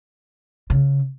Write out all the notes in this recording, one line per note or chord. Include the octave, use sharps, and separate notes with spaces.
C#3